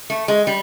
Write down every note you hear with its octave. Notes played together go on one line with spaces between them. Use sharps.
A3
G#3
G3